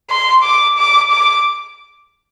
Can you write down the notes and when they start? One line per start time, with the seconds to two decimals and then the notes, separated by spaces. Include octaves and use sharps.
0.10 C6
0.44 D6
0.78 D6
1.11 D6